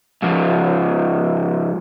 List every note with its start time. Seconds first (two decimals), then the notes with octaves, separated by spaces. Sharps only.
0.22 G#2 F3